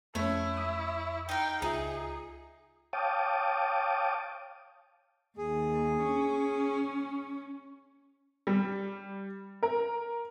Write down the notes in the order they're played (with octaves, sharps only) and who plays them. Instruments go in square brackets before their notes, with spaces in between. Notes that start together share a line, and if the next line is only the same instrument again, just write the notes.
[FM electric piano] F2 [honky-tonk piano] A3 C#4 [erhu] E4 [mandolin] C#5
[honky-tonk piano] D#6
[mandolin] D#4 F5 [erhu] G5
[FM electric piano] C#2 F4 E5 [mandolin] D#4 [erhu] G#4
[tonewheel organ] C#5 F5 G5 A5 D6 D#6
[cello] D#2 [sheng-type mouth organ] G#4
[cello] C#4
[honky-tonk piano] G3
A#4